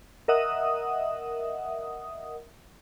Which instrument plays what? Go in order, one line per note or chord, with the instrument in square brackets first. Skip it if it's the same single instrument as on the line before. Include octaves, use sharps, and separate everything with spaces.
[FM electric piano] A#4 D#5 E5 F#5 D#6